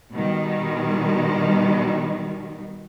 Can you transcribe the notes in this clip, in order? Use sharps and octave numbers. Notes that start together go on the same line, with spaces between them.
B2 D#3 G3